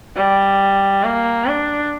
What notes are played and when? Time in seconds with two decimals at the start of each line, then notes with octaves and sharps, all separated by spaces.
0.16 G3
1.03 A#3
1.46 D4